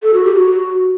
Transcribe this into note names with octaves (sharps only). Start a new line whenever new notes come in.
A4
F#4
G4
F#4